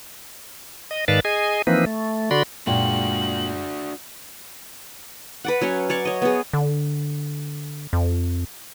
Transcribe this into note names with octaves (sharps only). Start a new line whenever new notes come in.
D#5
G#2 D#3 B4 D5 F5 A5
G#4 D#5 G#5
E3 F3 A#3 C4 D#4 B4
A3
D3 F#4 D5 B5 C6
F#2 A#2 G#3 D4 F#4 G5 F#7
B4 D5 F#5
F#3 C#4 C#5
C#5 D5 C#6
C#5 D#5
B3 G#4
D3
F2